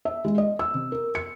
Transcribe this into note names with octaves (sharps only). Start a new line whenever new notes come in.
E5
G#3
D#5
E6
C3
A#4
C#7